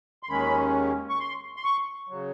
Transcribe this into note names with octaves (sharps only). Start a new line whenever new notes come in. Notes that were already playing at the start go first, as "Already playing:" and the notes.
C6
D#2 D#3 G#3 C#4 B5
C#6
C6
C6
C#6
C#3 F#3